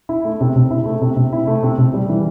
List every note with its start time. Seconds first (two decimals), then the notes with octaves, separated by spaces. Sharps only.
0.09 E4
0.25 A3
0.41 C3
0.56 C3
0.71 E4
0.86 A3
1.02 C3
1.16 C3
1.33 E4
1.47 A3
1.63 C3
1.78 C3
1.94 G3
2.09 E3